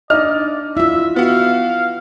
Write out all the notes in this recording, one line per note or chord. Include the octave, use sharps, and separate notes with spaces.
D4 D#4 D5 D#5 F6
E4 F4 E5
B3 F#4 F5